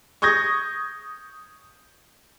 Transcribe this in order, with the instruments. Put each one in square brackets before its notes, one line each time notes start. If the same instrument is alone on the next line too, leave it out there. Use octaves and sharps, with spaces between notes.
[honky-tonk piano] C#6 D#6 G6 G#6 A#6